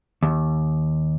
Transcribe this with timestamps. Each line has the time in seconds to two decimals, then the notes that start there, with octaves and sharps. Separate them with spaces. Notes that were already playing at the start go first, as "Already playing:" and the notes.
0.23 D#2